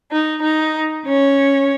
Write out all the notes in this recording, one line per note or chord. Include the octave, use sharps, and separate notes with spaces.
D#4
D#4
C#4 C#5